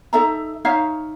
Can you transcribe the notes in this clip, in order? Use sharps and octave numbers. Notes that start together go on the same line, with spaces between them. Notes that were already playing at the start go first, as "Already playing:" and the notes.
D#4 A4 E5 A#5
D#4 C#5 E5 F5